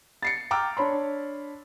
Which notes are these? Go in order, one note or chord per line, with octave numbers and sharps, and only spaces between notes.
A6 C7 C#7
G5 A#5 D6 E6 F6
D4 C#5 B5 C6